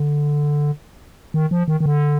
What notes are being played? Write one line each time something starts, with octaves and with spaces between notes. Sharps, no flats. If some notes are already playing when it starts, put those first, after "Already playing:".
Already playing: D3
D#3
F3
D#3
D#3
D3